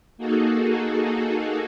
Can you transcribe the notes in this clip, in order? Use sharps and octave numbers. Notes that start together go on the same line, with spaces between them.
A#3 D#4 F#4 G#4 A4